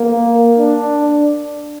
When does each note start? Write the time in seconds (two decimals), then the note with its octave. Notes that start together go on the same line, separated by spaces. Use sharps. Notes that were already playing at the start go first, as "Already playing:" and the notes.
Already playing: A#3
0.58 D4